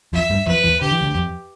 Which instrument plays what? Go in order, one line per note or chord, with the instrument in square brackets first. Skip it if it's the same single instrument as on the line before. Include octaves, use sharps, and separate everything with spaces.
[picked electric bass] F2 F3 [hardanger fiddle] E5
[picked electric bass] G2 G3
[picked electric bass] F2 F3 [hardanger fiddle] B4
[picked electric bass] E2 E3
[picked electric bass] D3 [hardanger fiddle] G4
[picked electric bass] E3
D2 D3
F2